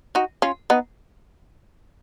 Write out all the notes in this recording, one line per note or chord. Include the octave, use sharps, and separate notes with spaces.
D#4 F#4
C#4 F4
B3 D#4